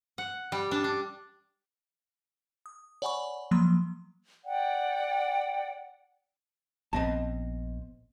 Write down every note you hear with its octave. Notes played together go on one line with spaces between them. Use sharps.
F#5
G3
D4
D4
D#6
C#5 D5 F#5 G#5 B5 C#6
F3 F#3 A#3 C6
D5 F#5 G5
A#1 B3 C4 D#5 A5